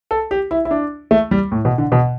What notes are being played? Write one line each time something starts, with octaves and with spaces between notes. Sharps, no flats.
A4
G4
E4
E4
D4
A3
G3
A2
B2
D3
B2